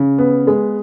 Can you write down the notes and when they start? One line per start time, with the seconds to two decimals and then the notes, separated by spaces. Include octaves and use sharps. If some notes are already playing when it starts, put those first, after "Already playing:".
Already playing: C#3
0.18 B3
0.47 G#3